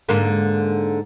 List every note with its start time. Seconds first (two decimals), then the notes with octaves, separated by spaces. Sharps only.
0.09 G#2 D3 A#3